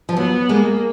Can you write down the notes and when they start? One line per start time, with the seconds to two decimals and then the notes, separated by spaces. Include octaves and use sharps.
0.09 F3
0.17 F#3 B3
0.49 G#3 A#3